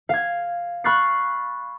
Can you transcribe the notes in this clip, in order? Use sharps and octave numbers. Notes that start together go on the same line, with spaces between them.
F5 G#6
B5 C#6 F6 F#6 A6 C7